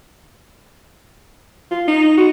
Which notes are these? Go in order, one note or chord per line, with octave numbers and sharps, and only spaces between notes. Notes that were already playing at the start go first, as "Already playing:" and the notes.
F4
D#4
F#4